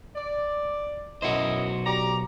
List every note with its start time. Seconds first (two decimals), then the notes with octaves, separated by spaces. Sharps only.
0.16 D5
1.22 B1 F#2 E4 F#4 C5 D#5
1.86 G4 D5 A#5